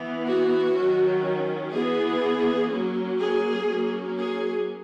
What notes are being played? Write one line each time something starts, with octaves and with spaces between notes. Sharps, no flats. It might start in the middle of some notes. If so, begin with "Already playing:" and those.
Already playing: E3 B3
F#4
D#3 F#3 C#4
E3 B3 G#4
F#3 A#3 C#4
G#4
F#3 A#3 C#4
G#4